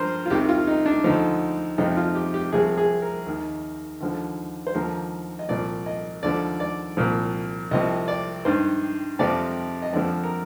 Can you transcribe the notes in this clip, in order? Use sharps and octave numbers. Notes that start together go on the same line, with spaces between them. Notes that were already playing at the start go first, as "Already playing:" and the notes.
Already playing: G2 F3 A#4 C5
F4
C2 C3 D#3 G4
F4
D#4
D4
D2 D3 F3 D#4
F2 C3 F3 D#4
F4
G4
G4
C2 C3 F3 G#4
G#4
A#4
D#2 D#3
D#2 D3 F3
C5
D#2 D3 F3 A#4
D#5
C2 A#2 F3 D5
D#5
D#2 D3 F3 D5
D5
C2 A#2 F3
C2 C3 F3 D#5
D5
G2 D#3 C5
F2 C3 F3 D5
D#5
F2 D3 F3 D5
A#4